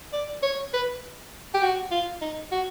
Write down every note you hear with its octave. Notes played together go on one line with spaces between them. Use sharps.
D5
C#5
B4
G4
F#4
F4
D#4
F#4